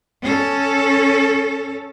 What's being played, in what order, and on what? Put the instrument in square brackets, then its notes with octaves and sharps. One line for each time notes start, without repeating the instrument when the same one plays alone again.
[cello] C#4 A4